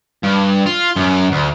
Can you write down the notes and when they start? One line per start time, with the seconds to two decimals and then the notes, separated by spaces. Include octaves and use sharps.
0.23 G2
0.66 F4
0.96 F#2
1.32 D2